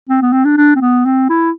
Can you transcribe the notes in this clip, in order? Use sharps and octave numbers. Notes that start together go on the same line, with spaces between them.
C4
B3
C4
D4
D4
C4
B3
C4
E4